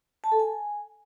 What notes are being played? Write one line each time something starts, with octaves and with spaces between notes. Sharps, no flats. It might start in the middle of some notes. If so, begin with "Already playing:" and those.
A5
A4
G#5